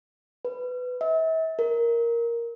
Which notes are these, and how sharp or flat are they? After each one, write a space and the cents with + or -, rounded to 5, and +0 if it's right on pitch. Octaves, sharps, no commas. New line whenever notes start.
B4 +15
E5 -40
A#4 +0